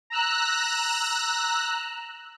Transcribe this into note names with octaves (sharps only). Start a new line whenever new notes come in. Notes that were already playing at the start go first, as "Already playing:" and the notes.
A#5 E6 F#6